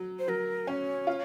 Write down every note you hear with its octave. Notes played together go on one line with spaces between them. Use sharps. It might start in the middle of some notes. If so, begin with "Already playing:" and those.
Already playing: F#3
C5
F#3 A#4
C#4 C#5
F4